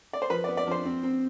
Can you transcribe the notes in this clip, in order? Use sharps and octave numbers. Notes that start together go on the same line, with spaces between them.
D5
C5
F3 B4
D5
B3
D5
F3 C5
C4
C4